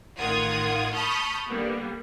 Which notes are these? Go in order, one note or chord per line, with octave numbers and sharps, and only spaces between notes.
A1 D#3 F4 F#5 D#6 G#6
A5 B5 C#6 D#6 F6 G6
D3 G3 A#3 B3